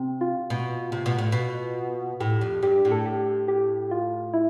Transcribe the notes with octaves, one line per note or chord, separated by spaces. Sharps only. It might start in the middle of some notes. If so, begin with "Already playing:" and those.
Already playing: C3
F4
B2
C3
B2
A2
B2
A2 G4
F2
G2 G4
A2
A4
G4
G4
F4
E4